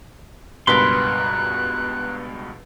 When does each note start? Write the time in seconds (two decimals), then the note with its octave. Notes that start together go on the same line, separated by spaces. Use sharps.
0.67 C#2 G2 B2 A#4 B4 C6 F#6